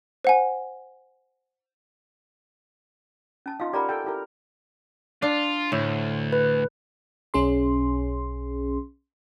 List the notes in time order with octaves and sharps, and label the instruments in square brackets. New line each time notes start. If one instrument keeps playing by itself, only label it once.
[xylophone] C5 F#5 G#5
[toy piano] C#4 A5
[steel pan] D#4 F4 [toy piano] F5
[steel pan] G4 A#4 F#5 [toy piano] D5 A#5 B5
[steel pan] A4 G5
E4 G4 A#4
[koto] D4 [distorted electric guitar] F4
[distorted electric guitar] D2 [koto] A2
[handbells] B4
[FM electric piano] B1 C#4 G#4 C6